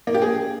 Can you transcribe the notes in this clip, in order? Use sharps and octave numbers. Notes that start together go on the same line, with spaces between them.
A#3
G4
G#4